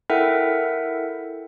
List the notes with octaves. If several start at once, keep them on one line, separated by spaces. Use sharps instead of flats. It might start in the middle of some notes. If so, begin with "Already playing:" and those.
E4 A4 A#4 E5 F#5 G5